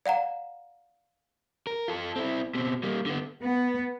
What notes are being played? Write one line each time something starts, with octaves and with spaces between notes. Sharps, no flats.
D5 F5 F#5 A#5
A#4
F4 A4
C4 E4
B2 C4
G3 A#3
D3 B3
B3